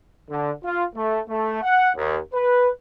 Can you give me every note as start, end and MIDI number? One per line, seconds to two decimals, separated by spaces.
0.30 0.51 50
0.64 0.84 65
0.95 1.20 57
1.28 1.62 57
1.63 1.90 78
1.96 2.19 39
2.33 2.69 71